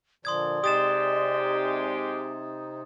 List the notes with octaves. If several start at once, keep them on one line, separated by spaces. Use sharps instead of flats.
A#2 D3 F3 D5 C6 D#6 G#6
C3 G#3 D#4 G4 D#6 A6 E7